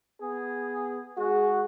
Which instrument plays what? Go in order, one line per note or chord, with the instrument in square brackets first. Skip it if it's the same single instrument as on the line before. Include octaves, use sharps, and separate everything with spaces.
[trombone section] B3 G#4
[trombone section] G#3 F#4 [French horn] G#4